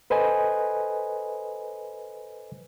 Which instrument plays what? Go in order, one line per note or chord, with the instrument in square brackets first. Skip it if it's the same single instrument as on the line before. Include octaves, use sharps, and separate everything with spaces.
[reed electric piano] A4 B4 C5 D#5 G#5